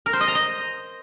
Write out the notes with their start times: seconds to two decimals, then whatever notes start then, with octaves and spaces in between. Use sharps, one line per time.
0.06 A#4
0.13 C5
0.20 D#5
0.28 A#5
0.35 D#5